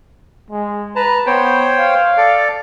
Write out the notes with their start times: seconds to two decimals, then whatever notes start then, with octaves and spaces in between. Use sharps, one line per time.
0.50 G#3
0.96 B4 A5 A#5
1.26 B3 C5 C#5 G5
1.78 F5
2.17 A4 D5